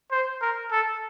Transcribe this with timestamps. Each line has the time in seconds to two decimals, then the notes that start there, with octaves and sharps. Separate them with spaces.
0.11 C5
0.41 A#4
0.71 A4